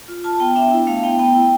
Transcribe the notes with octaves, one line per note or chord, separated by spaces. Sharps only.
F4
F4 A5
B3 G5
D4 E5
E4
A3 F5
B3 G5
B3 G5
E4